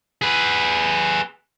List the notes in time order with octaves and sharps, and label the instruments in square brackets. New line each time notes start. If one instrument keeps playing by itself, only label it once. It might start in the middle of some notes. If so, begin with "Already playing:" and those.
[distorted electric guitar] G#4 B4